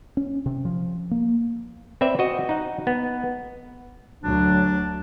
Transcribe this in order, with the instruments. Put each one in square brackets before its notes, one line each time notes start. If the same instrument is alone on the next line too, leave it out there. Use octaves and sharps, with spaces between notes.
[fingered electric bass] C#4
C3
F3
A#3
[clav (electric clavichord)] C4 B4 D5 E5
F#4 D#5
D#4 F#5
B3
[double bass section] D2 F#3 [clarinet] D4